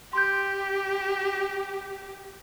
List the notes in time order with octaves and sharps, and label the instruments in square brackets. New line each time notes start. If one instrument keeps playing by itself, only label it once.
[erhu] G4 [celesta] C6 G6